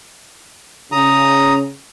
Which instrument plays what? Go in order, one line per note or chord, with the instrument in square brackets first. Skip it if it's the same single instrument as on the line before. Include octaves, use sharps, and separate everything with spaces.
[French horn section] C#3 [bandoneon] A#5 D#6